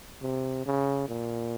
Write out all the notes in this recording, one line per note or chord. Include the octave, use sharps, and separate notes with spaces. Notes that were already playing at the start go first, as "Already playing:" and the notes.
C3
C#3
A#2